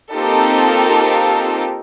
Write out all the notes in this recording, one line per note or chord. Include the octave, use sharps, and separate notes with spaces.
A#3 C4 D#4 F4 G4 A4